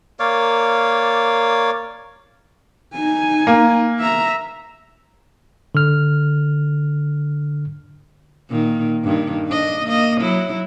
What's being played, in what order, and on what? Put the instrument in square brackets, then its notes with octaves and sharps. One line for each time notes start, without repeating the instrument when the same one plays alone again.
[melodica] A#3 C#5 D5 F5
[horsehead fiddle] D#4 G#5
[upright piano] A#3
[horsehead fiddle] E5 A#5
[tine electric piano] D3 F6
[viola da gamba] A#2 D#3
G2 D#3
D4 D#5
A#3 D#5
F#3 E4